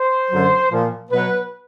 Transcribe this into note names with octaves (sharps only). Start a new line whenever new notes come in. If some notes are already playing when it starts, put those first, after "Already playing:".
Already playing: C5
F#2 D3 F#3
A#2 F3
B2 F#3 B4